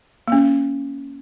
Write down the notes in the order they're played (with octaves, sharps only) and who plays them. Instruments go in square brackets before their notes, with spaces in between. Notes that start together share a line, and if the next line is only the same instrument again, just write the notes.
[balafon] A#3 C#4